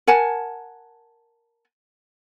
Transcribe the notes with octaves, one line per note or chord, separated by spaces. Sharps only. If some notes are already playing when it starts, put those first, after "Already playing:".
A#4 F#5 G#5 A5